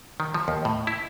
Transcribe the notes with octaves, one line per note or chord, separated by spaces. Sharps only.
D#3
F3
D#2
A2
E4